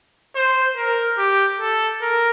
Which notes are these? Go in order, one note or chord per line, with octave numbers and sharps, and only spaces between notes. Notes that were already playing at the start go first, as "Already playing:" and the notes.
C5
A#4
G4
A4
A#4